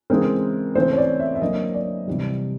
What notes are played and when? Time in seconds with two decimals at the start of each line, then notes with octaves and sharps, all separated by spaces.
0.10 C#3 E3 G#3 C4 A#4
0.75 C#3 E3 A3 C4 C5
0.93 C#5
0.98 D5
1.20 E5
1.35 E5
1.42 D3 F#3 A#3 D#5
1.74 D5
2.07 C3 E3 G3